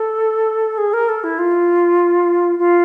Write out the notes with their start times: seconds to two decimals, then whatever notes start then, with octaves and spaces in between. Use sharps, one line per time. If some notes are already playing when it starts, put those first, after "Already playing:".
Already playing: A4
0.78 G#4
0.93 A#4
1.09 A4
1.24 E4
1.39 F4
2.59 F4